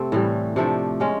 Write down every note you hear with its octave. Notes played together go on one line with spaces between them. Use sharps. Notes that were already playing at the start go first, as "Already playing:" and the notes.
Already playing: C3 A3 C4
A2 E3 G3
C3 F3 A3 D4
G#3 C#4 F4